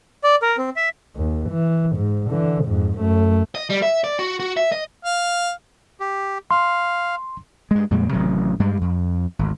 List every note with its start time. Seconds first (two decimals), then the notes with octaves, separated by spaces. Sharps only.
0.24 D5
0.42 A#4
0.58 C4
0.76 E5
1.16 D#2
1.49 E3
1.96 G#2
2.30 D3 E3
2.64 F2 G#2
2.99 F#2 A3
3.55 D#5
3.70 G3
3.83 E5
4.04 D5
4.19 F#4
4.40 F#4
4.57 E5
4.72 D#5
5.05 F5
6.00 G4
6.51 F5 C6
7.71 G2 G#3
7.91 F2 A#2 G3 G#3
8.13 A1 C3 D#3 F#3
8.60 G2 G3 G#3
8.81 F2
9.39 G#1 D2